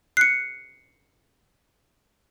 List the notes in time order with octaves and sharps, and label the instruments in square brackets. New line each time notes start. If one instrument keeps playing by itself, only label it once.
[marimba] F#6 [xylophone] C7 C#7